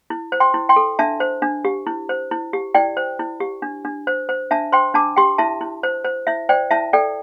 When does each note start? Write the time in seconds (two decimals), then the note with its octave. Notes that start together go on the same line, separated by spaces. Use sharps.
0.10 E4
0.32 C5
0.40 G5 C6
0.54 E4
0.69 G5 C6
0.76 A4
0.99 D4 E5 A5
1.20 C5
1.42 D4
1.65 G4
1.87 E4
2.09 C5
2.31 E4
2.53 G4
2.74 E4 D5 G5
2.97 C5
3.19 E4
3.40 G4
3.62 D4
3.85 D4
4.07 C5
4.29 C5
4.51 D4 E5 A5
4.72 C5 G5 C6
4.94 D4 A5 D6
5.16 G4 G5 C6
5.38 E4 E5 A5
5.61 E4
5.83 C5
6.04 C5
6.27 E4 E5
6.49 C5 D5 G5
6.71 E4 E5 A5
6.93 A4 D5 G5